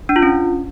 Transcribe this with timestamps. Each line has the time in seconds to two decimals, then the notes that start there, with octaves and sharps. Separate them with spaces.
0.09 D4
0.16 F4
0.23 C#4